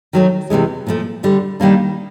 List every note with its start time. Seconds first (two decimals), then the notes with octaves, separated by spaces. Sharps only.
0.13 D#3 F#3 A3
0.50 E2 C3 E3 G#3
0.87 A#2 F3 A3
1.23 D2 D3 G3
1.60 D#3 G3 A#3 D4